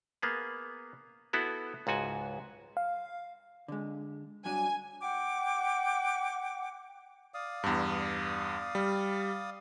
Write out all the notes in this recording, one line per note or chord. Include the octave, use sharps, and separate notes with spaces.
A#3 B3 G#4
B3 E4 F#4 A4
C#2 G#2 F#4 G#5 A5
F5
D3 G#3
G2 F#3 D4 G#5
F#5 G5 D6
D5 F5 D#6
E2 G2
G3